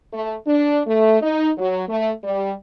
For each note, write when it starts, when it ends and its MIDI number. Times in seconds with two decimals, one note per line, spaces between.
0.13 0.36 57
0.47 0.80 62
0.86 1.20 57
1.21 1.49 63
1.58 1.82 54
1.89 2.12 57
2.24 2.53 55